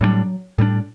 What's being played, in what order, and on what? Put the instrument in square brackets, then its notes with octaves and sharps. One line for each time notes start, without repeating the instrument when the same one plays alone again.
[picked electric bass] A2 G3 A#3 D4 [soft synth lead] F#3
[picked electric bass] A2 G3 A#3 D4